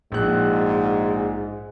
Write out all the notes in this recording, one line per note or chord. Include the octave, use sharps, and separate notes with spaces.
A#1 G#2 F#6